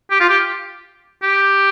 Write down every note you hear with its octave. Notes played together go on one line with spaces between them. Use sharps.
G4
F4
G4
G4